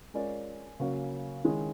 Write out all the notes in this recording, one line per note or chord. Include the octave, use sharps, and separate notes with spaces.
G#3 C#4 F4 A#4 D5
C#3 F#3 A#3 C#4 F#4
D#3 G#3 C#4 E4 G#4